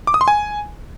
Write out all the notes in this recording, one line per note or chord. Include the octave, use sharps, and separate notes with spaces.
D6
D#6
C6
G#5